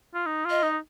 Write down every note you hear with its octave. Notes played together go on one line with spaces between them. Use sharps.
F4
D#4
F4
D#5
D#4